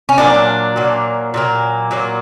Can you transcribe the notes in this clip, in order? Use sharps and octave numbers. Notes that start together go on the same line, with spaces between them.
C#4
A#2 F#3 A#3 D4
A#2 F#3 A#3
A#2 F#3 A#3
A#2 F#3 A#3